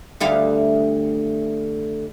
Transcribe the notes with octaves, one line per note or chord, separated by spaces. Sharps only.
D2 G3 F5